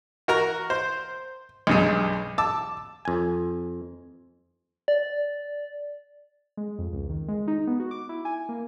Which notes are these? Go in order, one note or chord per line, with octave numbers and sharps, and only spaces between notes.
F#4 A#4 A#5
C5
B1 G2 G#3
A5 D6 E6
F2 G#5
D5
G#3
F2
C#2
D#3
G#3
D#4
B3
F#4
D6
E4
G#5
A#3